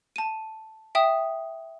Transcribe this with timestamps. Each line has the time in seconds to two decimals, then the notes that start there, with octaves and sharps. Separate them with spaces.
0.16 A5 D#7
0.95 E5 G5 D#6 E7